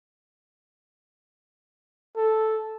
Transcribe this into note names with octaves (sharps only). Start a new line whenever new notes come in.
A4